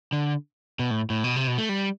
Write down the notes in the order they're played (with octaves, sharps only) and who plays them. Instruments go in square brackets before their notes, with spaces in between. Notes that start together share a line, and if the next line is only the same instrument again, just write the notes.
[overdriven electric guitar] D3
B2
A2
A2
B2
C3
B2
A3
G3